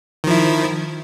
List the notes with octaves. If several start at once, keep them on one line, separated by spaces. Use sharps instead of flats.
D#3 F3 E4